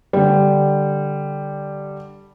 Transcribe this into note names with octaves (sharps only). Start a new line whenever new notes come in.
D3 G3